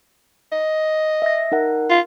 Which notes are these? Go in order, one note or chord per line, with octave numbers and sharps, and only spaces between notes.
D#5
E5 A#6
D#4 A#4 F#5
F4